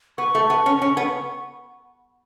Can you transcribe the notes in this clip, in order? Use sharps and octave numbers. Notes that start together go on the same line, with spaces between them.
B3 C#6
A3
B3
C#4
C#4
B3